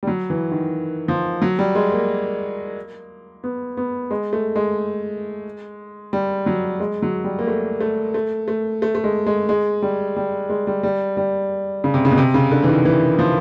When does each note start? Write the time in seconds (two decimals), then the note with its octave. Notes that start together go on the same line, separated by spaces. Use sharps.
0.03 G3
0.07 F#3
0.30 E3
0.52 D#3
1.08 F3
1.42 F#3
1.59 G3
1.75 G#3
1.92 A#3
3.44 B3
3.77 B3
4.11 G#3
4.33 A3
4.56 G#3
6.13 G3
6.46 F#3
6.80 G#3
7.02 F#3
7.24 G3
7.39 A#3
7.47 A3
7.81 A3
8.14 A3
8.48 A3
8.82 A3
8.95 A3
9.04 G#3
9.26 G#3
9.49 G#3
9.82 G3
10.16 G3
10.49 G#3
10.67 G3
10.83 G3
11.17 G3
11.84 C#3
11.94 C3
12.05 C#3
12.11 B2
12.18 C3
12.34 C#3
12.51 D3
12.63 E3
12.68 D#3
12.85 E3
13.19 F3